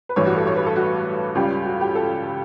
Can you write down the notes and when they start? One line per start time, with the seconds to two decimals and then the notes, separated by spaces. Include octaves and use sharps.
0.09 B4
0.16 A1 G2 E3 G3 C#5
0.26 F#4
0.36 A4
0.47 C#5
0.56 B4
0.66 A4
0.76 F#4
1.35 C#2 C#3 G3 G4
1.66 F#4
1.81 G4
1.95 A4